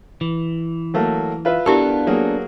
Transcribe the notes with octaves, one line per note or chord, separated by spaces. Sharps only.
E3
F#3 A3 A#3
F4 B4 E5
B3 D4 E4 G4 A4 A#4
F#3 A#3 G#4